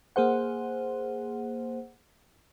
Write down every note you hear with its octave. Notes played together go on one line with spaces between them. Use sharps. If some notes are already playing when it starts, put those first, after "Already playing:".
A#3 G#4 C5 F#5